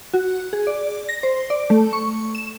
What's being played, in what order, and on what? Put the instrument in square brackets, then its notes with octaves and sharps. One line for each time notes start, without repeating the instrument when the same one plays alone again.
[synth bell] F#4
G#4
D5
A#6
C5
D5
A3
C#6
E7